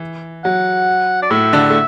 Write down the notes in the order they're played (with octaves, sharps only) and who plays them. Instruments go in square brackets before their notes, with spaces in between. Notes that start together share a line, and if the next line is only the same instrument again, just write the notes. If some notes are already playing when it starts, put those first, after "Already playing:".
Already playing: [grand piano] E3
[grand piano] F#3 [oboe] F#5
[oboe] D5
[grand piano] A2 A3 [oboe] E5
[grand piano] D3 D4
A3